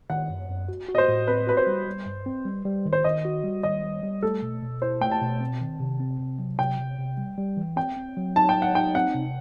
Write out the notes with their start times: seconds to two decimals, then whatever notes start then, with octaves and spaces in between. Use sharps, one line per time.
0.10 D#3 F#5
0.30 F#2
0.49 F#2
0.68 F#4
0.89 F#4
0.95 D#5
0.98 C5
1.08 A2
1.27 C4 B4
1.47 F#4 B4
1.57 C5
1.67 G3
1.87 G3
2.06 G2
2.26 C4
2.45 G3
2.65 G3
2.85 D#3
2.93 C5
3.04 D#3 D#5
3.25 F#4
3.44 G3
3.63 D#3 D#5
3.84 G3
4.03 G3
4.22 A3 A4
4.42 B2
4.62 B2
4.82 E4 C5
5.01 A3 G5
5.11 A5
5.22 B2
5.40 C4
5.61 D#3
5.80 C3
6.00 C4
6.20 C3
6.39 F#3
6.59 C3 G5
6.79 C3
6.99 C3
7.17 G3
7.38 G3
7.57 E3
7.76 C4 G5
7.97 C4
8.17 F#3
8.36 D#4 A5
8.49 G5
8.56 F#3
8.62 F#5
8.75 D#4 G5
8.95 C4 F#5
9.15 C3